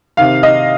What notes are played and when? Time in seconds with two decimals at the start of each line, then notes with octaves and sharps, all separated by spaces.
0.17 C3 D#3 F5
0.43 D#5